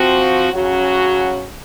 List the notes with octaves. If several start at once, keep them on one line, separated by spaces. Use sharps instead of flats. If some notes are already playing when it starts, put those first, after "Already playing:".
Already playing: F3 C4 F#4
C#3 F#3 C#4 F#4